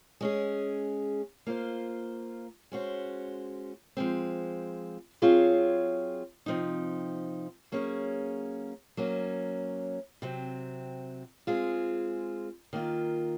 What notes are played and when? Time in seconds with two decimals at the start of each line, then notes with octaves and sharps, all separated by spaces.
0.21 G#3 C#4 G#4
1.47 A#3 F4 C5
2.72 G#3 C#4 F#4 C5
3.97 F3 G#3 C4
5.22 F#3 C4 F4 G#4 C#5
6.46 C3 F3 C4 D#4
7.72 F#3 A#3 C#4 G#4 C#5
8.97 F#3 A#3 C#4
10.22 C3 F#3 C4
11.47 G#3 C4 F4 G#4
12.73 D#3 A#3 F4